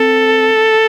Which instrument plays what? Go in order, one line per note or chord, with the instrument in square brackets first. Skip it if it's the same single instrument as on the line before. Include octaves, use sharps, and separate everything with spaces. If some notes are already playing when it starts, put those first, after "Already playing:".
Already playing: [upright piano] C4 [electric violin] A4